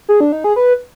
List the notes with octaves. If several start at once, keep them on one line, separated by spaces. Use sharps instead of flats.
G#4
D4
D#4
G#4
B4